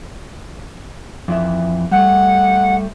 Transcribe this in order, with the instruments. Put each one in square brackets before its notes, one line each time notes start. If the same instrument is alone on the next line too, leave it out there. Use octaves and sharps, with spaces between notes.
[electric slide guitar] F2 E3 E5
[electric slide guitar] G3 A3 [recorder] F#5